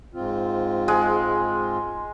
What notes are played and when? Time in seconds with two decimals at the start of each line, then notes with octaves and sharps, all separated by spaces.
0.14 G#2 C4 F4
0.88 G#3